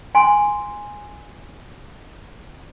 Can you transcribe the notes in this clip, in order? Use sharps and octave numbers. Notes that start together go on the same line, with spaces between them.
G#5 C6